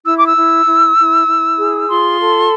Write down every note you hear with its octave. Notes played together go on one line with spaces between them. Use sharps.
E4 E6
D6
E6
E4
E4
E4
E4
G#4
F4 C6
A4